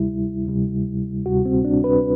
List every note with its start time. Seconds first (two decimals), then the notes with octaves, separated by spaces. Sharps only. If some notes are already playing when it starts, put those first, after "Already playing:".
Already playing: D2 C3 G3 E4
0.47 D2 C3 G3
1.26 D2 C3 G3 F#4
1.46 C4
1.65 D4
1.84 B4